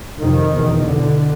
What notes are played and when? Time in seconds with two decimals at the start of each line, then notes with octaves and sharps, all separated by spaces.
0.19 F2 C3 D#3
0.53 E2 B2
0.86 E2 B2 D3